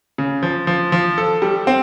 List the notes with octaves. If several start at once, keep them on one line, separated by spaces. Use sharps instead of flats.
C#3
F3
F3
F3
A4
G3
C4